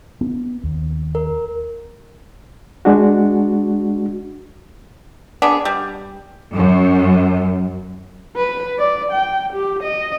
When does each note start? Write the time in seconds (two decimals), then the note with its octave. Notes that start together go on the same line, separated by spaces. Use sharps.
0.21 B3
0.64 D#2
1.15 A#4
2.85 G#3 D4 F#4
5.42 B3 D4 G#4
5.65 G3
6.54 F#2
8.36 B4
8.79 D5
9.11 G5
9.53 G4
9.83 D#5